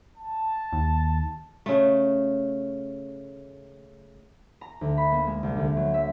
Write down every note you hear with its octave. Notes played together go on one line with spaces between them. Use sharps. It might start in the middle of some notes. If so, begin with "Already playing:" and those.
A5
D#2
C#3 A3
A#5
D2
B5
A#3
G#3
C2
D2
F#3
E5